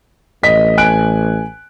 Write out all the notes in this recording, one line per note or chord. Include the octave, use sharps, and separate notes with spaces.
A1 D#5 B6
G#5 F#6 D7